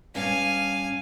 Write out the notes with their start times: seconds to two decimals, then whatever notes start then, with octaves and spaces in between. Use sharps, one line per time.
0.15 G2 C#4 F5 G#5